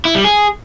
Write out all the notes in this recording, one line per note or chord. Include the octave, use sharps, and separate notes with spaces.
E4
G3
G#4